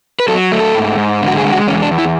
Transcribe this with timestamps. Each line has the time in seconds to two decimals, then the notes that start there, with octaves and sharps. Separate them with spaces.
0.20 B4
0.28 F#3 A4
0.52 A3
0.60 A4
0.75 G#2
0.98 G#2
1.22 D3
1.27 F#4
1.37 G#4
1.44 G#3
1.52 F#4
1.67 E2 C#4
1.82 D4
1.91 E2
1.98 E4